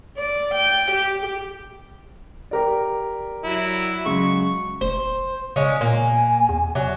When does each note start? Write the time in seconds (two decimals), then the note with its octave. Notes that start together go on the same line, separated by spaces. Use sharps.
0.17 D5
0.54 G5
0.91 G4
2.51 G4 A#4 D5
3.44 F#3 E4
4.06 C#3 F#3 G#3 C#6
4.81 F1 C5
5.56 C#3 G#3 C#4
5.81 A#2 A#3 G#5
6.49 E2
6.75 C3 F#3